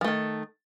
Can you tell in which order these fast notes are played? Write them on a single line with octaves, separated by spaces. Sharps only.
F3 A3 D#3